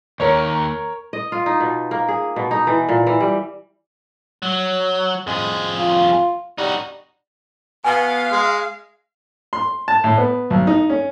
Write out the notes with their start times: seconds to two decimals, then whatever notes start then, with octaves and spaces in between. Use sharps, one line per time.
0.20 D#2 A#4 C#5
1.13 D#5
1.32 F4
1.46 D#4
1.60 B2
1.91 A#3
2.08 G#4
2.36 B2
2.51 D#4
2.67 E3
2.89 A#2
3.07 E3
3.20 G3
4.42 F#3
5.27 F2 G#3 G#4
5.79 F4
6.58 G3 D#4 F#4
7.84 B2 B3 F5 G#5
8.32 G#3
9.53 C6
9.88 A5
10.04 A2
10.18 B3
10.50 B1
10.67 D#4
10.90 C#4